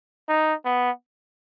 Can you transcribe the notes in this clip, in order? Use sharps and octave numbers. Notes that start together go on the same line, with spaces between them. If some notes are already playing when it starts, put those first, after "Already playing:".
D#4
B3